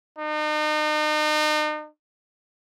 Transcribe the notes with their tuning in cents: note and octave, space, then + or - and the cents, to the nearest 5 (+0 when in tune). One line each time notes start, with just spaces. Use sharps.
D#4 -40